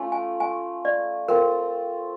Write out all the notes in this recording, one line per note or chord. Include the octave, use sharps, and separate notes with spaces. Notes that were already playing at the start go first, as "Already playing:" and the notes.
Already playing: A3 C#4 F4
G#5
G#5
D5
C4 F4 A4 A#4